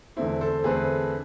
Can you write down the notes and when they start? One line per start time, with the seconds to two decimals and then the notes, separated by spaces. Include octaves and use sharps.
0.16 E2 D3 A3 C4 E4
0.41 A4 C5
0.64 E2 D3 A3 C4 G#4 B4